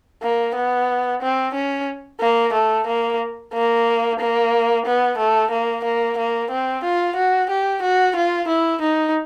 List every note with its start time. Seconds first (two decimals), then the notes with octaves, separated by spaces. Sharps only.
0.23 A#3
0.55 B3
1.22 C4
1.54 C#4
2.21 A#3
2.53 A3
2.87 A#3
3.54 A#3
4.19 A#3
4.86 B3
5.18 A3
5.51 A#3
5.85 A#3
6.18 A#3
6.51 C4
6.84 F4
7.16 F#4
7.50 G4
7.82 F#4
8.16 F4
8.48 E4
8.81 D#4